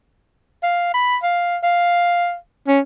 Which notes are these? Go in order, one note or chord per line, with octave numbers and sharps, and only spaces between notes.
F5
B5
F5
F5
C#4